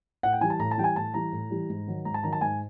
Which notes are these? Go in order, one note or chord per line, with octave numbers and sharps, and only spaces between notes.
A2 F#5
G5
E3 G3 G#5
A5
A2 A#5
A5
E3 G3 G5
G#5
A2 A5
E3 G3 A#5
A2
E3 G3
G#2
D#3 F#3
G#2 A#5
A5
D#3 F#3 A#5
A5
G#2 G#5